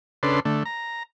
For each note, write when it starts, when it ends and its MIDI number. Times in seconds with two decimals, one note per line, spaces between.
0.23 0.40 49
0.23 0.40 62
0.23 0.40 69
0.23 0.40 71
0.23 0.40 84
0.45 0.63 50
0.45 0.63 57
0.65 1.03 82